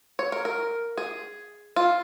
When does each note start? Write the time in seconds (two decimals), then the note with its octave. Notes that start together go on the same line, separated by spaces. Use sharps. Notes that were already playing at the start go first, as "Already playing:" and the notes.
0.19 C#5
0.32 A#4
0.45 A#4
0.98 G#4
1.76 F4